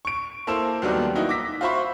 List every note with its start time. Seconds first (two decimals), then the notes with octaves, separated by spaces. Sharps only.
0.05 C#6 D7
0.47 A#3 E4 A4 C5 E6 E7
0.82 D#2 D#3 F#3 G3 B3 D4
1.15 A#3 D#4 E4 F#4
1.29 D6 E6 A#6 B6
1.61 F4 F#4 C5 E5 B5 C#6